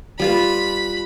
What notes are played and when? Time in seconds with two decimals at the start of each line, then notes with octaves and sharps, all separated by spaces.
0.20 G3 F4 B4 B5